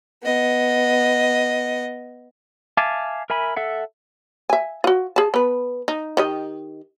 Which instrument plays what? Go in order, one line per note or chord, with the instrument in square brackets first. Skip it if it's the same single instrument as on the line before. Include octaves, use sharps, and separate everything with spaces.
[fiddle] B3 D#5
[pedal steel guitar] E5 F5 G#5 A5 D6
A#4 E5 G#5 B5
A4 E5 F#5
[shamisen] E5 G#5
F4 F#4
G#4 A5
B3 B4
D#4
D#3 G4 D#5